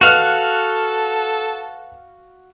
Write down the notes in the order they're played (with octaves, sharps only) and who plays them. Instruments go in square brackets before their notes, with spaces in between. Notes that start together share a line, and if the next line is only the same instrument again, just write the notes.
[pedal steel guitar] F#4 F5 [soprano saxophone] A4 [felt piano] B4 F6 F#6